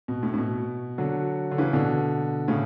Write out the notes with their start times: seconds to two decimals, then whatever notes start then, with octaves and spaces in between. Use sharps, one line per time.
0.08 B2
0.23 A2
0.34 A2
0.38 B2
0.98 D3 F#3
1.51 D3
1.58 C#3 E3
1.73 B2 D3
2.48 A2 C#3